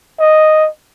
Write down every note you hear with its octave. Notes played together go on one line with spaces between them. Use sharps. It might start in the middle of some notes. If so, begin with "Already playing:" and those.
D#5